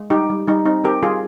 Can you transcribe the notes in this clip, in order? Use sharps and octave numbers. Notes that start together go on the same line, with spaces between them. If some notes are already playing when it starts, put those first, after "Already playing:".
Already playing: G#3
G3 D#4 G4
G3
G3 D#4
C4 D#4
C4 G4 A#4
G3 F4 G#4